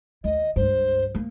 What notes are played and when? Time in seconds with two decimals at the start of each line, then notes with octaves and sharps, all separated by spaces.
0.24 D#2 D#5
0.56 C#2 G2 C5
1.15 A#3